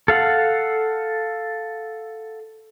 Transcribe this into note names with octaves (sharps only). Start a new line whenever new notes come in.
A4 F5 F#5